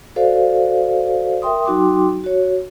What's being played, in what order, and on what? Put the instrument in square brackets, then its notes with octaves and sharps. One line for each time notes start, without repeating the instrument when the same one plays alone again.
[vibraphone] F#4 A4 C5 D5 F5
A#4 E5 G5 C6 D#6
F#3 D#4 F#4 G5 C6 D6
F#4 C#5